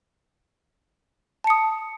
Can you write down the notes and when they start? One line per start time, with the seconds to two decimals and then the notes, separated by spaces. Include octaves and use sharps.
1.44 A5
1.47 C#7
1.50 D#6